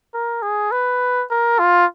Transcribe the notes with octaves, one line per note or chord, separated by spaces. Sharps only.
A#4
G#4
B4
A#4
F4